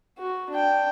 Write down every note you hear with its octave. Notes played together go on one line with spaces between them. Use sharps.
F#4
D4 G5